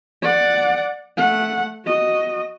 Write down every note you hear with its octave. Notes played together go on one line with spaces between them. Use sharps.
D5 F#5
A3 F#5
F#4 D#5